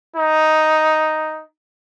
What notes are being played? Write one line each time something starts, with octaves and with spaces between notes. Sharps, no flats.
D#4